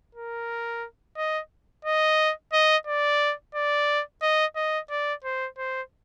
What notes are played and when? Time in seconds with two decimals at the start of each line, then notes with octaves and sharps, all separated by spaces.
0.15 A#4
1.17 D#5
1.85 D#5
2.53 D#5
2.87 D5
3.55 D5
4.22 D#5
4.56 D#5
4.90 D5
5.24 C5
5.58 C5